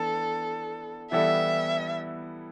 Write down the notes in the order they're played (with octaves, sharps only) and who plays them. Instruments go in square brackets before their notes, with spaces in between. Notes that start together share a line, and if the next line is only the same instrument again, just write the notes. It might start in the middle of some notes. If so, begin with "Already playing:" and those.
Already playing: [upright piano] E3 B3 D4 [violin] A4
[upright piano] E3 G3 B3 E4 A4 [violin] E5